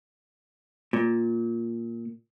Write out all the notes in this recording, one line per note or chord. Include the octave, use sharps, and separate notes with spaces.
A#2